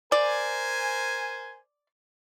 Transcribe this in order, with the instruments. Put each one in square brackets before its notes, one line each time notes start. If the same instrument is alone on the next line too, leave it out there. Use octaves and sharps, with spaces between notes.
[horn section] A#4 C5 G#5 [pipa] D5